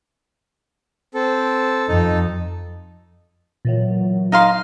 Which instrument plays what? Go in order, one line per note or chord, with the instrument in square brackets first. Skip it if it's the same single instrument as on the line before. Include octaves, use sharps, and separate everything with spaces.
[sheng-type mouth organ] C4 A4
[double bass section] F2 [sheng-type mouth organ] D#4 A4
[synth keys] A#2 E3 F#3
[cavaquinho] D#4 F5 C6